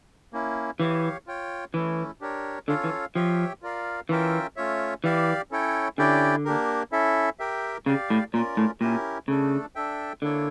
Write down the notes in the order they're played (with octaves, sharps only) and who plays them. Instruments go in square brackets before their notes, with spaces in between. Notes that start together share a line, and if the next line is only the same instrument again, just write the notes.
[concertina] A#3 C#4 E4
[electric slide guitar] E3 [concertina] G4 C#5 F5
[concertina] F4 C#5 G5
[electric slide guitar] E3 [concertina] A3 C#4 E4
[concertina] D4 G4 A#4 C#5
[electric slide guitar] D3 [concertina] C#4 F4 A4 C#5 F5
[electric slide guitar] E3
[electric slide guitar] F3 [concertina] G4 C#5 E5 G5
[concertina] F4 A#4 D5 F5
[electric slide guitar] E3 [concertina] C#4 F4 A#4 E5 G5
[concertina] A3 C#4 F4 C#5 E5
[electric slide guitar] E3 [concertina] G4 D5 F5
[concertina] C#4 E4 A4 C#5 G5
[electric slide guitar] D3 [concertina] C#4 E4 G4 D5 G5
[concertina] A#3 D4 G4 A#4
C#4 E4 A4 E5
G4 A#4 E5 G5
[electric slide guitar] C#3 [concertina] G4 D5 F5
[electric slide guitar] A2
[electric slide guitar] A#2 [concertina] C#4 F4 A#4 D5
[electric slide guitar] A2
[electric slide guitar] A#2 [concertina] C#4 E4 G4 A#4
[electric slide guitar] C#3 [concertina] A3 D4 A4
[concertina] D4 A4 E5 G5
[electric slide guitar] D3 [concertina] A#3 E4 A4 C#5